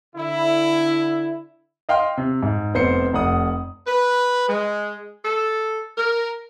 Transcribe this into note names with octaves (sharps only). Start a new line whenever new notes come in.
D3 E4
D#5 F5 G5 C6 F6
C3
G#2
F1 B3 C4 C5 C7 C#7
F1 F#5 D#6
B4
G#3
A4
A#4